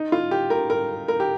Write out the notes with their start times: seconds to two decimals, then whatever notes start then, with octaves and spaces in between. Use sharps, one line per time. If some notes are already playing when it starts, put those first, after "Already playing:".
Already playing: D#4
0.12 F4
0.31 G4
0.50 A#4
0.70 A#4
1.08 A#4
1.20 G4